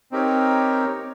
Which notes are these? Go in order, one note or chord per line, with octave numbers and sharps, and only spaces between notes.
C4 D#4 G4 A#4 C#5